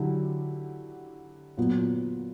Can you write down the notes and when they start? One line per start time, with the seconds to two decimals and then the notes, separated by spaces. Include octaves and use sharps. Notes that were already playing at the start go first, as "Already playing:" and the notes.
Already playing: D3 F#3 E4 G4
1.57 A#2 F#3 B3